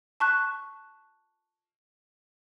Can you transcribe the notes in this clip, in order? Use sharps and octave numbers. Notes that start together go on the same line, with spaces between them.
A5 C#6 F#6